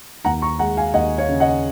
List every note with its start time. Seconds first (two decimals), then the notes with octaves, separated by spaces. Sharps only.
0.25 D#2 F#5 A#5
0.42 A#5 C#6
0.59 G#3 F#5 A#5
0.77 F5 G#5
0.94 D#2 D#5 F#5
1.18 C#5 F5
1.29 C#3
1.40 D#5 F#5